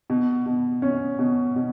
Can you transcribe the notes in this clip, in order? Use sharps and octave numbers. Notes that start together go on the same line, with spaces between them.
B2
B2
C#4
B2
B2